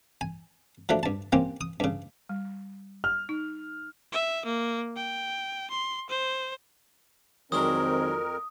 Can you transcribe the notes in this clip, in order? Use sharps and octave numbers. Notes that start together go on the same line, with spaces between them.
G#5
F3 F#3 A3 D4
G2 A5
A#3 C4 C#4 G4
D#6
G2 C#3
G3
F6
D#4
E5
A#3
G5
C6
C5
F2 D#3 F#3 G#3 C4 D4 A#4 D#6